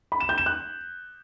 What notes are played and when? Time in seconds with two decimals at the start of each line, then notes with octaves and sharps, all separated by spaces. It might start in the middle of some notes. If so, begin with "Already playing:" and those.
0.12 B5
0.20 E7
0.29 G6
0.38 E7
0.46 F#6